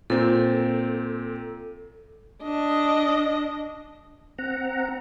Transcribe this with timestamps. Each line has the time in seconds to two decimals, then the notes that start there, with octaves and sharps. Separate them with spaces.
0.10 A#2 C4 A4
2.43 D4 D#5
4.38 C4 F#5 A#5